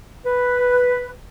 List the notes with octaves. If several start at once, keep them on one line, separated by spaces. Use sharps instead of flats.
B4